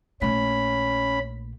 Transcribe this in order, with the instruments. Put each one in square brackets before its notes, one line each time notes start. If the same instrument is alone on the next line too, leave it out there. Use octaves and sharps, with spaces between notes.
[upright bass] A#1 A3 [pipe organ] C#4 B5